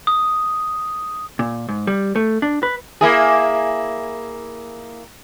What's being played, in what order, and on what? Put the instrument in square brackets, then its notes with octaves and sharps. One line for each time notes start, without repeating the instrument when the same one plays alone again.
[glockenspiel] D#6
[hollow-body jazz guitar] A#2
G#2
G3
A3
D4
B4
[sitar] A#3 E4 G#4